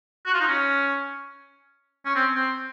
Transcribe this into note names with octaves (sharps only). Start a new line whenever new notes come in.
F#4
F4
D#4
C#4
C#4
C4
C4